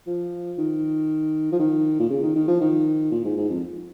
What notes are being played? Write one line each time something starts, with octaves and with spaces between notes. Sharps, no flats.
F3
D#3
F3
D#3
A#2
C#3
D#3
D#3
F3
D#3
A#2
G#2
G#2
F2